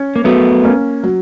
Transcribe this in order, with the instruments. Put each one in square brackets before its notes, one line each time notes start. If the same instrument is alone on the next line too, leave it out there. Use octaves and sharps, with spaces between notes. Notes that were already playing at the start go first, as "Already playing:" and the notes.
Already playing: [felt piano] C#4
[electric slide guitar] A#3
[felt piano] F#3 [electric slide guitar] A3 B3
[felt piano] A#3 C#4
F#3